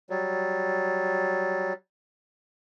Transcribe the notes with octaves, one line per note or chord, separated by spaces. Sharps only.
F#3 G3